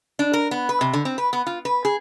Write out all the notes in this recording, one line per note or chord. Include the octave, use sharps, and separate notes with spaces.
D4
A#4
B3
B4
C3
D3
C4
B4
B3
F4
B4
G#4